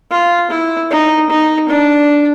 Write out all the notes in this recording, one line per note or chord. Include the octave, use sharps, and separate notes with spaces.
F4
E4
D#4
D#4
D4